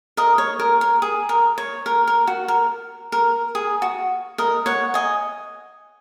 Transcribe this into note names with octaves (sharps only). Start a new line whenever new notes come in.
A#4 D#5
C#5
A#4
A#4
G#4
A#4
C#5
A#4
A#4
F#4
A#4
A#4
G#4
F#4
A#4 D#5
C#5 F#5
D#5 G#5